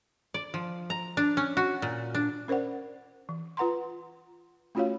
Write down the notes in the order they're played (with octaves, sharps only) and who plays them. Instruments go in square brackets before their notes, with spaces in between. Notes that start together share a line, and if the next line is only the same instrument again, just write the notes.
[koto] D5
F3
A#5
D4
C#4
F#4
A#2
D4
[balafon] C#4 A#4 C5 D5 F#5
E3
F4 B4 F#5 A#5 C6
A3 C#4 F4 F#4 C#5 F5